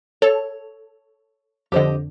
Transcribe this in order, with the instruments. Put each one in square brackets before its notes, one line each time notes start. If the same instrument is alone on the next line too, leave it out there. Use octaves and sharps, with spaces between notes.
[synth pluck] A4 [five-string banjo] C#5
[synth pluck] F2 D3 [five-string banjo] G4 C5 D#5